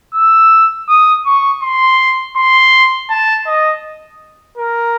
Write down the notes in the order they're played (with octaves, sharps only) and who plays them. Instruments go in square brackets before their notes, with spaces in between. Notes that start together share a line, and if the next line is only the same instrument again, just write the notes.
[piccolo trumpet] E6
D#6
C#6
C6
C6
A5
D#5
A#4